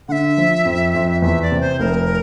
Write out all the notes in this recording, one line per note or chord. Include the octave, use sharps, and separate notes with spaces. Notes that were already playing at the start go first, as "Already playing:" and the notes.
D3 E5 F#5
F3
F2
F2
E2 E5
D5
C3
C5
F1 A#4